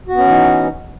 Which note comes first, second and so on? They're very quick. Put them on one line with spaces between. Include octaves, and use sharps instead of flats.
F#4 B3 C#4 E3 D#4